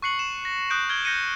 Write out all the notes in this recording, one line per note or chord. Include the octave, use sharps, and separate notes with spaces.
C#6 F#6 C7 C#7 F#7
E7
A#6
D#6 F#6 G6 D7
F6 G#6 D7 G7
G6 A#6 C#7 D#7